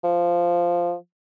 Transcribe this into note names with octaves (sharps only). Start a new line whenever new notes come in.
F3